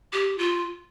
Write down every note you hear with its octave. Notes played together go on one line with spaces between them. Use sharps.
G4
F4